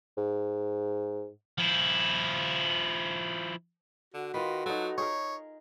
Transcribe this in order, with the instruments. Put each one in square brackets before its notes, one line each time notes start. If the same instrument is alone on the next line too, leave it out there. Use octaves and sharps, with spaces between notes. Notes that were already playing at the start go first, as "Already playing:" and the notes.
[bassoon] G#2
[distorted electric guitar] F3 E4
[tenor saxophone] D3 [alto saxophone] F#4
[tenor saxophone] D#3 [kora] F4 B4
[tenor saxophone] F#3 [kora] D#4 A4
[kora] D#4 G#4 A#4 [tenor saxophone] C#5